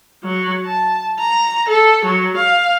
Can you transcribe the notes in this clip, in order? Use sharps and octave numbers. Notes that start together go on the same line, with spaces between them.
F#3
A5
A#5
A4
F#3
F5